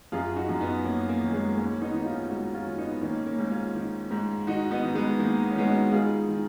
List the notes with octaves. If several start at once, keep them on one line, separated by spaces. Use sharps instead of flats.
F#2 F4 G#4
D#4 F#4
F#2
B3 D#4
F#2 A#3 C#4
A#3
D#3 C#4
G#3 B3
G#2 A#3 C#4
B3 D#4
D#3 D#4
C#4 F4
G#2 D#4 F#4
C#4 F4
D#3
B3 D#4
B3
D#3 A#3 C#4
A#3 C#4
G#2
C#4 F4
D#3
G#2
D#3 D#4 F#4
B3 D#4
D#3
G#3 B3
D#3 A#3
B3
C#4
D#3 G#3 B3
D#4 F#4
G#2 F4 G#4
D#3